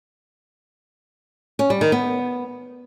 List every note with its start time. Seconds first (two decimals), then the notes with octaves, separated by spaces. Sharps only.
1.59 C#4
1.70 G3
1.81 D#3
1.92 B3